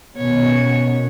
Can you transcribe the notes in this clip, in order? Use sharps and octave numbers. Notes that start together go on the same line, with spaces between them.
B2 D#3 B3 C#4 C#5